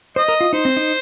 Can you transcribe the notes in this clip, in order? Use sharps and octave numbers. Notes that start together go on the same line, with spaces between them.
C5 D#5
A#4
F4
D#4 C5
C4
D#4